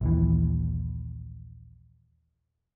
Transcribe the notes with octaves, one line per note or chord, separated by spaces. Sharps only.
A#1 D#2 E3